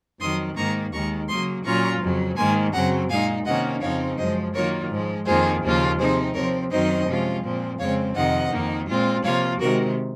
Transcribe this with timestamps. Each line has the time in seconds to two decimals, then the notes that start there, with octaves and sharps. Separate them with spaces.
0.21 F2 D#3 F#3 C6 D#6
0.56 G#2 D#3 A#3 A#5 C#6
0.93 D#2 D#3 G#3 A#5 C#6
1.29 C#3 F#3 A#3 C6 D#6
1.65 A#2 F#3 C#4 F4 A#5 C#6
2.02 F2 C#3 F#3
2.37 G#2 D#3 A#3 G#5 C6
2.73 F#2 C#3 F#3 C4 F#5 A#5
3.10 A#2 G#3 D#4 F5 G#5
3.46 C3 D#3 A#3 C#4 D#5 F#5
3.81 F2 C#3 F3 C4 D#4 C#5 F5
4.18 F#2 F3 G#3 C5 D#5
4.54 D#3 F#3 A#3 F4 A#4 C#5
4.90 G#2 F3 G#3
5.26 F2 D#3 A#3 F4 G#4 C5
5.63 D#2 C#3 F3 A#3 F4
5.99 C3 F3 C4 D#4 G#4 C5
6.34 C3 F3 C4 A#4 C#5
6.71 F#2 D#3 F#3 C4 D#4 C5 D#5
7.07 C3 F3 G#3 C#4 F4
7.43 A#2 F3 C4
7.79 F2 C#3 G#3 C4 C#5 F5
8.15 F2 C3 D#3 D#5 F#5
8.51 F2 D#3 A#3 D#4
8.88 A#2 G#3 C4 F4
9.24 C3 F3 A#3 F4 C#5 F5
9.60 C3 D#3 G#3 F#4 A#4